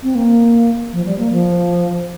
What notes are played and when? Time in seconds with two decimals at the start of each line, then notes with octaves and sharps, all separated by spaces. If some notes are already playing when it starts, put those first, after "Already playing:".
0.03 C4
0.15 A#3
0.93 F3
1.06 G3
1.19 A#3
1.32 F3